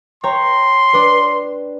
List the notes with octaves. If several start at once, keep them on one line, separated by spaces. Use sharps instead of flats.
C#5 G5 A#5 C6
D4 B4